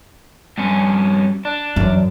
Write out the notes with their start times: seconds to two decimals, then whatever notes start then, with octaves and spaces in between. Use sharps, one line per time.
0.58 G2 C#4
1.45 D4
1.76 F#2 E3